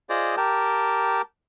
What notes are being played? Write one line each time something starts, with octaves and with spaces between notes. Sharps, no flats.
F4 G#4 C5 D5 D#5
G4 A#4 G5 A5